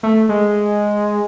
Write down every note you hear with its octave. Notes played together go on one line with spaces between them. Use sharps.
A3
G#3